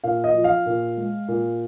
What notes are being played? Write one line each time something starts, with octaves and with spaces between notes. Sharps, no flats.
A#2 F5
D#5
F3
F5
A#2
G#3
A#2